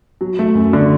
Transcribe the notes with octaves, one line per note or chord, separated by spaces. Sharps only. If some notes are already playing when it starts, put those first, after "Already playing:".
F#3
A3
F#2
D3